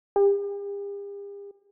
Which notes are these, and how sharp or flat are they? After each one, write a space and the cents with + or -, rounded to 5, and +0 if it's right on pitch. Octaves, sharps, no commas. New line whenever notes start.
G4 +45